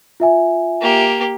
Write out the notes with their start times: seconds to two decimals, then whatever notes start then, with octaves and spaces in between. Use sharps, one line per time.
0.20 F4 E5 G#5
0.81 A#3 G4